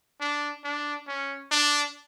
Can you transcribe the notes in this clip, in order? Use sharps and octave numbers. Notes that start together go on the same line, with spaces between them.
D4
D4
C#4
D4